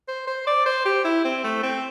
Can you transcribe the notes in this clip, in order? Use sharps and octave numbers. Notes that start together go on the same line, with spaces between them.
C5
C5
D5
C5
G4
E4
C4
A3
C4